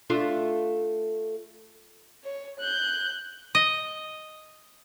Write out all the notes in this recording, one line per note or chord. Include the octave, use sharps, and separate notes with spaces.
A3 D4 F4
C#5
F#6 G6
D#5